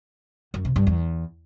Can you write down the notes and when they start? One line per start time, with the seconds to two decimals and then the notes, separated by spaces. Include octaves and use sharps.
0.54 F#2
0.65 C3
0.76 G2
0.87 E2